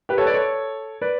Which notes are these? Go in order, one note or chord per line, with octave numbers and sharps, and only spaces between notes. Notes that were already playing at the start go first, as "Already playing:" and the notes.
G4 B4
A4 C#5
B4 D5
A4 C#5
B4 D5